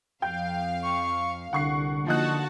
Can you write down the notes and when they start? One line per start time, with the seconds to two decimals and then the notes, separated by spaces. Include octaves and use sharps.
0.22 F2 F5 G5 G6
0.82 C#6
1.53 C2 D3 F#5 C#6 C7
2.07 F3 A#3 D#4 F#4 A5 F#6